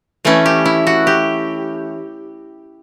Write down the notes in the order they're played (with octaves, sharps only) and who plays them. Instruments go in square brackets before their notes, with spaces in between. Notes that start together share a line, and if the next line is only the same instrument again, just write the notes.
[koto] E3 A3 C#4 E4
G4
E4
F#4
G4